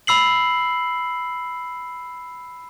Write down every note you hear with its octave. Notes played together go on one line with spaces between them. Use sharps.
B5 E6 C7 F#7